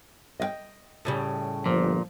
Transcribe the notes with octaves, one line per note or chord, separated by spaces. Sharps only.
D#5 E5 G5
A2 C#3 G3
G1 A#2 F3